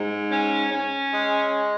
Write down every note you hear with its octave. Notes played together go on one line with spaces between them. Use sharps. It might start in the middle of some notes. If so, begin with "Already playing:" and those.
Already playing: G#2
C#4
C#4
G#3